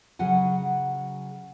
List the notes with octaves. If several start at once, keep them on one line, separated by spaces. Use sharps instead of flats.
C#3 F#3 F#4 F#5 G#5